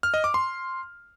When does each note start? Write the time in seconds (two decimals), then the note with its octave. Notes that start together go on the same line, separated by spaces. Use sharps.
0.03 F6
0.14 D#5
0.24 D6
0.34 C6